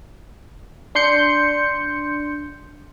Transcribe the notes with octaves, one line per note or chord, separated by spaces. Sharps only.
D4 C6 G6 C#7